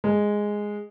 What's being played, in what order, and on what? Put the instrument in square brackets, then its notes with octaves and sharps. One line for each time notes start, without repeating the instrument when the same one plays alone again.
[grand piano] G#3